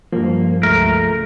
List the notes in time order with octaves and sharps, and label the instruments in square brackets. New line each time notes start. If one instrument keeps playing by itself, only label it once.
[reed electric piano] G2 F3 [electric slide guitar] A#3
[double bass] C#2 [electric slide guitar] A3 [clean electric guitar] A#4